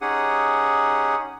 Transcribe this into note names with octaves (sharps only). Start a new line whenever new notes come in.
C#4 D#4 G4 G#4 F#5 D#6